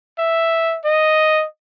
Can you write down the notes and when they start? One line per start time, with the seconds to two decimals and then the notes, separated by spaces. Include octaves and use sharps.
0.19 E5
0.85 D#5